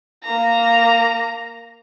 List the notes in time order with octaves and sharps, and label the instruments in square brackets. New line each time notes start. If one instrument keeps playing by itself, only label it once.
[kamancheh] A#3 A#5